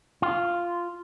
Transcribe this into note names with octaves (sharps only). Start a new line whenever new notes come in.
F4